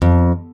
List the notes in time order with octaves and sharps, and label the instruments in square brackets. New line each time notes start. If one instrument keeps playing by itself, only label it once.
[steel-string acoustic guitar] F2